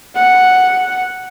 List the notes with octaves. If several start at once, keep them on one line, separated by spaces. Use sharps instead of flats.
F#5